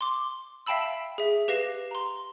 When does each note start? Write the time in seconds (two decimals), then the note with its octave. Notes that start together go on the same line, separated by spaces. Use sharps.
0.01 C6 D6
0.66 E5 F5 G5 A5 B5 E6
1.18 G#4 E5
1.48 G4 B4 F5 A#6 C7 E7
1.91 A#5 C6